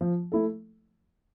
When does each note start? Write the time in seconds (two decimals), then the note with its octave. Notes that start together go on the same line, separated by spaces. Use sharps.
0.01 F3
0.32 A3 E4 A4